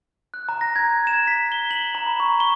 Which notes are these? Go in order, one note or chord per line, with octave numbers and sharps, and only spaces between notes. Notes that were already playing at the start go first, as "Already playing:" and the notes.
F#6
A#5
A#6
G#6
E7
B6
G7
F#7
A#5
B5
C#6
G7